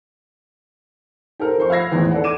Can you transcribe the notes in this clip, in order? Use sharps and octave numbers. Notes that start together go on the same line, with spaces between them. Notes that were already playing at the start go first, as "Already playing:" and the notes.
G4 A4 A#4 C5
F2 C5 C#6
F5 B5 E6 G#6 A#6 C7
G#1 E2 A2 B3
A4 B4 D5 F#5
D6 G#6 D#7 E7